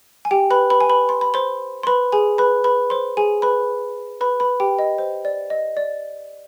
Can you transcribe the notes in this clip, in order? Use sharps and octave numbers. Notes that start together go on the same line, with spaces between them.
G#5
G4 G5
B4 B5
B4 B5
G#5
B4 B5
C6
B5
C5 C6
C6
B4 B5
G#4 G#5
B4 B5
B4 B5
C5 C6
G#4 G#5
B4 B5
B4 B5
B4 B5
G4 G5
D#5
C5
D5
D#5
D5